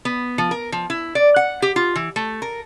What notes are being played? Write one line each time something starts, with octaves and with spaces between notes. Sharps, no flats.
B3
F3
A#4
F3
E4
D5
F#5
G4
F4
E3
A3
A#4